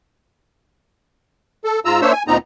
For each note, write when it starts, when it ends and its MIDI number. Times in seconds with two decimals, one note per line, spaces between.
1.64 1.80 69
1.85 2.01 44
1.85 2.01 65
1.85 2.01 82
1.85 2.01 88
2.01 2.12 58
2.01 2.12 62
2.01 2.12 72
2.01 2.12 73
2.01 2.12 76
2.01 2.12 88
2.13 2.23 80
2.28 2.37 38
2.28 2.37 46
2.28 2.37 59
2.28 2.37 60
2.28 2.37 63
2.28 2.37 82